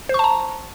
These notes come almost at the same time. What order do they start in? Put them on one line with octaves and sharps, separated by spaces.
C5 C#6 A5 A#5